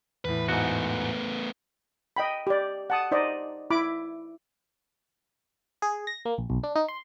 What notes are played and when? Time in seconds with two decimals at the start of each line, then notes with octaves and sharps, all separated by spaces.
0.25 E2 A2 B4
0.48 G#2 A3 B3 F#4
2.17 D#5 G5 B5
2.47 G4 D5
2.90 F#5 A5 D#6
3.12 D#4 C5 D5 D#5
3.70 E4 B5 D6
5.82 G#4
6.07 A#6
6.25 A#3
6.38 A#1
6.50 B1
6.63 D4
6.75 D#4
6.88 C6